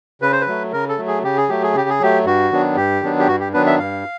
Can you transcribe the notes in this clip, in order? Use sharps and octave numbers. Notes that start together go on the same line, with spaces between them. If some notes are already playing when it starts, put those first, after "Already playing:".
C#3 B4
C5
B4
F#3 A3
C#3 A#4
A4
F#3 A3
G#4
C#3 G4
G#4
F#3 A3 G4
G#4
C#3 G4
G#4
F#3 A3 G4
G2 F#4
D#3 F#3 B3 D4
G2 G4
D#3 F#3 B3 D4
G4
G2 F#4
G4
D#3 F#3 B3 D4 B4
E5
G2 F5